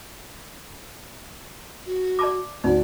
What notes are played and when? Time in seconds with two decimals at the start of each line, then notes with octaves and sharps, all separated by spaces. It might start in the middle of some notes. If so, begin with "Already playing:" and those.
1.86 F#4
2.19 D5 A5 D6
2.64 D2 D#4 D5